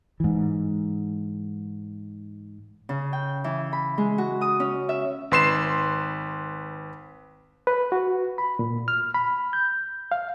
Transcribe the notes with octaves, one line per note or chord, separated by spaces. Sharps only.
G#2 E3
C#3
G5
E3
B5
G#3
F#4
D#6
C#4
E5
G#1 B4 C6 C7 E7
B4
F#4
B5
A#2
F6
B5
G6
F5